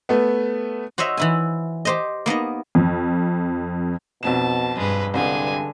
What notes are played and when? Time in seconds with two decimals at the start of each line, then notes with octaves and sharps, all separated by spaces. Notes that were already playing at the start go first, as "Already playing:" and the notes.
0.09 A3 B3
0.98 F#4 C5 C#5 D#5 E5
1.17 E3 E4 G#5
1.85 G4 C5 D#5
2.26 A#3 B3 D#4 D#5
2.75 F2
4.23 B1 F2 B2 A5 E7
4.76 G2 G#3 B4
5.14 C2 G2 D3 G#3 G#5